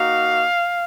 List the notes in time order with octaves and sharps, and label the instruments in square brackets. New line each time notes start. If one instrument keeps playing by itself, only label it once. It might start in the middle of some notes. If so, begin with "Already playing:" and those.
Already playing: [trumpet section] A#3 D#4 F#4 F5